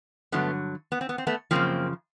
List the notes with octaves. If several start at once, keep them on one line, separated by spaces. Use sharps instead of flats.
G2 D3 F#3 A3 B3
B3
C4
B3
C4
A3 B3
F#2 C#3 F3 A#3 C4